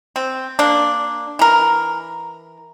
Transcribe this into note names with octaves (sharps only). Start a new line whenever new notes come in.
C4
A#3 D4
E3 A#4